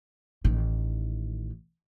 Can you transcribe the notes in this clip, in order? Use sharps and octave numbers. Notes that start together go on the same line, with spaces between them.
A1 D#3